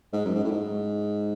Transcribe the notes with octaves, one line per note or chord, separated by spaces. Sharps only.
G#2
F#2
G#2
A2
G#2